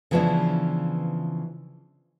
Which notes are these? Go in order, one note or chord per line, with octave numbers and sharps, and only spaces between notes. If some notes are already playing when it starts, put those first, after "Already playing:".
C#3 E3 F3 B3 D4 E4